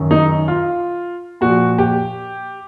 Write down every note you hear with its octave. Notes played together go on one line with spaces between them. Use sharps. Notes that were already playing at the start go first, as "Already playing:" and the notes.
Already playing: F#2 D#3
D#4
F4
A#2 F3 F#4
G4